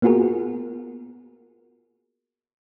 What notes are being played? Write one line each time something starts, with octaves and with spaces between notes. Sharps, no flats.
A#3 B3 F4 F#4 G#4 A#4